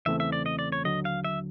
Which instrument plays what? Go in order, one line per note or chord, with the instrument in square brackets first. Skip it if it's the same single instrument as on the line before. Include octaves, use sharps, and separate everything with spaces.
[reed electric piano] E2 C#3 E3 A3 C4 [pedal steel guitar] E5
[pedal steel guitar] E5
D5
D#5
D5
C#5
[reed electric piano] D#2 D3 F#3 [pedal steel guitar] D#5
[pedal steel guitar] F5
E5